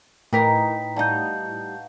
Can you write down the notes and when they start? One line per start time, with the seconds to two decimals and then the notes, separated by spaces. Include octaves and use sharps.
0.33 A2 E3 D#4 A#4 B4 D#5 G5 B6
0.96 G3 D#4 F#4 F5 F#5 A5 G6